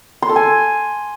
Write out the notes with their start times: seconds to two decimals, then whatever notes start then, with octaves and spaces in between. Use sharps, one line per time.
0.22 C6
0.29 A4
0.36 G#5